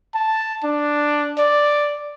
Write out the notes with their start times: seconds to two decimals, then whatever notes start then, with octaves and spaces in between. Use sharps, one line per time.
0.15 A5
0.64 D4
1.38 D5